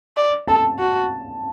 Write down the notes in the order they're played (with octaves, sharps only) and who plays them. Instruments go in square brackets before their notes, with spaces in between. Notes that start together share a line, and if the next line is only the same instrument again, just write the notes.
[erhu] D5
[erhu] A4 [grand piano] A5
[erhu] F#4